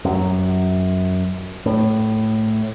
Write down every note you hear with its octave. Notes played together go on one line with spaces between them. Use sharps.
F#2
A2